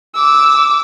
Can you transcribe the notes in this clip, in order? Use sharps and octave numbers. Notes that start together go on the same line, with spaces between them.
D6 E6